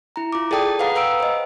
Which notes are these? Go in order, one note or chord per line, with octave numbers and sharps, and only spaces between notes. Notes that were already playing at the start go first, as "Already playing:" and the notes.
E4 A#5
F4 D6
G#4 A4 D5 G5 A5 D#6
B4 F5 F#5 A#5 D#6
B4 F5 G5 A#5 E6 D7
C5 D#5